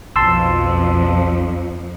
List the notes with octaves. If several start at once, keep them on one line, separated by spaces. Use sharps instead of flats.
B1 F2 F3 A5 C6 E6